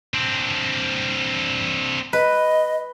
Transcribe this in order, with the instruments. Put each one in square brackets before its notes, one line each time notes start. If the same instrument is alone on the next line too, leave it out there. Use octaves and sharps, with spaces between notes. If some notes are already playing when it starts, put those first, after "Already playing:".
[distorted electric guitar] C4 D4
[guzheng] B4 [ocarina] D#5